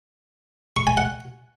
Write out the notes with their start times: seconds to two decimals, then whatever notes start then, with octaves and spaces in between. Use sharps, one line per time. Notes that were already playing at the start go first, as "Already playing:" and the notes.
0.76 C#6
0.87 G#5
0.97 F#5